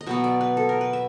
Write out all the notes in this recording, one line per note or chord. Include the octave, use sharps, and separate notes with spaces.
D#5
B2 F#3 B3 E5
D5
B4
A4
A#4
B4
E5